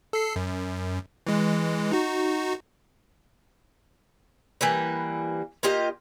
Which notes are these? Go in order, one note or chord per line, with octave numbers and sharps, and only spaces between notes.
A4 C7
F#2
E3 G#3
D#4 F#4
E3 G3 A#3 B4
A#3 F4 G4 D#5